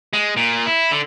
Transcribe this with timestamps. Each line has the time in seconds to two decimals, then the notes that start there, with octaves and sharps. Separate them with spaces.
0.13 G#3
0.37 A#2
0.66 E4
0.91 D3